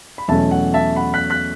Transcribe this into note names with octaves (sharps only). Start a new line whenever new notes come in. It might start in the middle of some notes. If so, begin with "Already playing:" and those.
B5
E2 B2 F#3 A3 C#4 E5 A5
F#5
E5 A5
F#5 B5
F#6 B6
F#6 B6